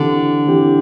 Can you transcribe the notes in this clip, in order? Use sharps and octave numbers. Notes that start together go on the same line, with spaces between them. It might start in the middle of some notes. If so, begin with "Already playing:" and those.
Already playing: D3 E3 C4 G4
E3 C4 G4